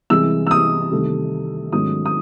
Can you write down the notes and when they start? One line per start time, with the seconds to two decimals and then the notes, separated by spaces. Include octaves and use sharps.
0.10 C2 C3 E3 G#3 E6
0.47 E6
0.51 D#6
0.92 C2 C3 D#3 A3
1.72 G#2 D#3 F#3 A3 C#4 D#6
2.06 D#6